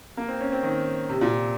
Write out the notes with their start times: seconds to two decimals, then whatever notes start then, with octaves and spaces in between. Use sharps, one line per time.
0.17 A#3
0.28 C4
0.41 C#4
0.52 C4
0.63 D#3
1.09 C3
1.21 A#2